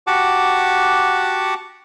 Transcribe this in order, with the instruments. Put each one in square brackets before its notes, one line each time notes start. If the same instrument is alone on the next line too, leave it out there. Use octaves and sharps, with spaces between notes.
[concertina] F#4 G4 F#5 A5 D6